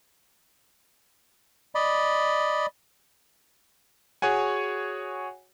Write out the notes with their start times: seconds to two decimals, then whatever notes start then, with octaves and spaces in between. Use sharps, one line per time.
1.75 D5 D#5 B5
4.22 F#4 G#4 C#5 F#5 G#5